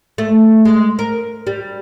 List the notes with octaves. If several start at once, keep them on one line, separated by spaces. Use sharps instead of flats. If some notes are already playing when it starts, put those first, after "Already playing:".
A3
G#3
A#4
G3